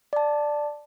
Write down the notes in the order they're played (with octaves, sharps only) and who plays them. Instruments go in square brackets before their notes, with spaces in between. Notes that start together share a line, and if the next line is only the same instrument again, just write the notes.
[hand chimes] D5 A5